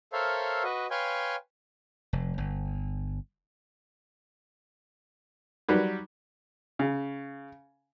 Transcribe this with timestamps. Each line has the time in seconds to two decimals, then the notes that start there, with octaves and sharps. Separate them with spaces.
0.13 A4 A#4 C5 C#5 E5 F5
0.63 F#4 B4 D#5
0.90 B4 C#5 F5 G5 G#5 C6
2.13 F1
2.38 G1
5.69 F#3 G3 D#4 B4
6.79 C#3